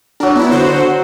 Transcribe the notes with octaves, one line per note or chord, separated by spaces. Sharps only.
F#3 D4 A#4
B3 E4
D3 F#4 C5